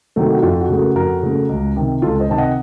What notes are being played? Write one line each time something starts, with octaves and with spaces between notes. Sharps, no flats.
C3 D#3 F#3 A3
F#4
F2 F4
F#4
C#3 A3
F#4 A#4
F2 F#4 A#4
C#3 A3
C#2
C3 D#3
C#2 F4 A4
C5 D#5
C3 D#3 A5
D#5 F#5